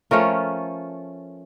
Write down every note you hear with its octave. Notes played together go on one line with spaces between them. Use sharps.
F3 A3 C#4 F4 A#4